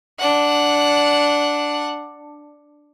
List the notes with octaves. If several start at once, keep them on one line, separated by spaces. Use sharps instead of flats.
D4 F#5